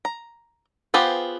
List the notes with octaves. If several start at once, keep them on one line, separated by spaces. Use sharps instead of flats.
A#5
B3 F4 G4 G#4 C5